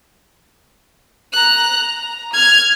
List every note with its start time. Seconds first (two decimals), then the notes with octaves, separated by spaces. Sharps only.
1.33 A#5 F#6
1.79 A#5
2.33 F6 G#6